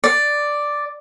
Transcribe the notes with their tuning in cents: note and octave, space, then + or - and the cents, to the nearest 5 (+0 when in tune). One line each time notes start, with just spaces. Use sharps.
D5 +0